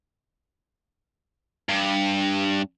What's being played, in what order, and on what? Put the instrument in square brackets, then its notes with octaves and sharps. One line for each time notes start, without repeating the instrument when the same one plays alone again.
[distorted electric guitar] G2